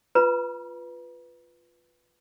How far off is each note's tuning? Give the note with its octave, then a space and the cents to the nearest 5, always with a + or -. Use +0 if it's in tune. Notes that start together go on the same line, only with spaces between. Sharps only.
F4 +0 B4 +0 A#5 +45